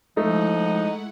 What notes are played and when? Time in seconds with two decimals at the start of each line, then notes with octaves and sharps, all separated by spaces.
0.17 F3 G#3 A3 D#4 E4 F#5